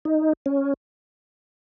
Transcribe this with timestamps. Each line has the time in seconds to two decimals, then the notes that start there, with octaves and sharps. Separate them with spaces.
0.05 D#4
0.46 C#4